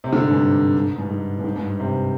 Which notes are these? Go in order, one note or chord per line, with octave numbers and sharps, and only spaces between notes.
C3
D3
G#2
G2
G#2
G2
G#2
G2
G#2
G2
G#2
C3